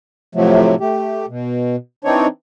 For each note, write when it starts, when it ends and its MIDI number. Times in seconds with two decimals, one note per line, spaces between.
0.35 0.75 45
0.35 0.75 48
0.35 0.75 53
0.35 0.75 54
0.35 0.75 57
0.80 1.26 57
0.80 1.26 67
1.29 1.76 47
2.05 2.27 52
2.05 2.27 60
2.05 2.27 62
2.05 2.27 63
2.05 2.27 73